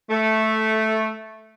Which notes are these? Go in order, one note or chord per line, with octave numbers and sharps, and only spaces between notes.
A3